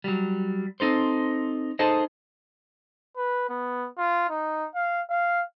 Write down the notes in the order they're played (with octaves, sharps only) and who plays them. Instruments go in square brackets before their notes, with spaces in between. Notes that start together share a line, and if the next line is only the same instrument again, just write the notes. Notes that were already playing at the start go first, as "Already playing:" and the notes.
[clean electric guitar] F#3 G3
C4 D#4 A4 C5
D#4 G#4 A4 C5 D#5
[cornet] B4
B3
F4
D#4
F5
F5